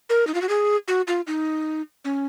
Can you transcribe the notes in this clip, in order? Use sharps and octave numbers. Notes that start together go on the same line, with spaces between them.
A#4
D#4
F4
F#4
G#4
F#4
F4
D#4
C#4